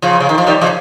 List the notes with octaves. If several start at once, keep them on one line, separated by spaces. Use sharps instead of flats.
C#3 F3
C#3
D#3
F3
D#3 G3
C#3 F3